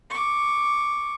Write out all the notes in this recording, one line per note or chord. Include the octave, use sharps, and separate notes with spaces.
C#6 D6